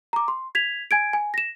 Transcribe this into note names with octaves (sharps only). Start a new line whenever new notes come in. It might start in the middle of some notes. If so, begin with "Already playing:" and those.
A#5 D6
C6
G#6 B6 F7
G#5 G#6 D7
G#5
A#6 E7